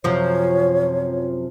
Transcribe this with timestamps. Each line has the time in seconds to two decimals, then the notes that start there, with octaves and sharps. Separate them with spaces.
0.04 F#2 C3 F3 C#5